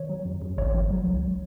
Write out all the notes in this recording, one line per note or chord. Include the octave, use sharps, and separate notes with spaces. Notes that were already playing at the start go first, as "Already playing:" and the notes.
Already playing: D#3 C#5
F#3
F#2
F#2
G#1 C#5
F3
F#3
C#2